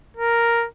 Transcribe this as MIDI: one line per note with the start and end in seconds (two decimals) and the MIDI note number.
0.17 0.66 70